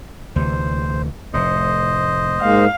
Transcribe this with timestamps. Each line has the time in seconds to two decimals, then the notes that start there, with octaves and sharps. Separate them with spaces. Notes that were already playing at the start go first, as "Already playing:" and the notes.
0.36 D2 C3 E3 C5
1.34 F1 A2 C5 D#5
2.41 G#2 G#3 A#3 F5